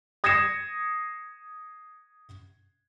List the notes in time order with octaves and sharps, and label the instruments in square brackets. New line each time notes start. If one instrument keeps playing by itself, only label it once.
[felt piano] D#6 G#6 A#6 C7 C#7 E7